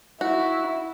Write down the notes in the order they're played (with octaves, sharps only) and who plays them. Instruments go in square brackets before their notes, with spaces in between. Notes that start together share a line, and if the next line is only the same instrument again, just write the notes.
[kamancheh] E4 [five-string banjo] F#4